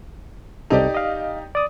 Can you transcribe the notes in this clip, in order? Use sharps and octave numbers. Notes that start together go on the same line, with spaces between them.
C2 C3 D#4 G4 A4 D5
D#5 F5
D5 D#6